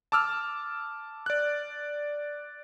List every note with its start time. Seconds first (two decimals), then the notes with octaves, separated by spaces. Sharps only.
0.12 A5 D6 E6 F6
1.26 D5 F#6